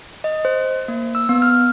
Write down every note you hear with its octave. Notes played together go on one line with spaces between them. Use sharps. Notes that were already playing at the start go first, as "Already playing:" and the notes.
D#5
C5
A#3
E6
B3
F6